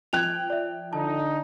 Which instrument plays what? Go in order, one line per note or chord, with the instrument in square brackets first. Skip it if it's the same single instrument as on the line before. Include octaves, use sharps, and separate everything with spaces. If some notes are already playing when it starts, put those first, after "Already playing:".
[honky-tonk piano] F3 G5 F#6 [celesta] G#6 F7
[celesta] D5 E5
[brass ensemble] D3 D#4 [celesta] A5